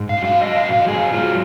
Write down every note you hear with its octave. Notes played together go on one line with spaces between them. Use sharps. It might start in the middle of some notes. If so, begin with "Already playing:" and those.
Already playing: G#2
F5
F#3
F5
G#2 D#5
F5
F#3
F5
G#2 G#4
F#3 F4